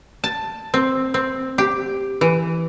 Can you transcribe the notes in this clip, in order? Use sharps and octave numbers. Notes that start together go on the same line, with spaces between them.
A5
C4
C4
G4
E3